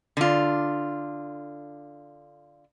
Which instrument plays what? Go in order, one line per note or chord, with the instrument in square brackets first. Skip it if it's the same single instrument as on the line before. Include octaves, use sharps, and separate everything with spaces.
[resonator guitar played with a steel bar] D3 F4